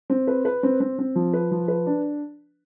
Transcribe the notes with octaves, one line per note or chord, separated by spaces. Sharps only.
C4
B4
B4
C4
C4
C4
F3
B4
F3
B4
D4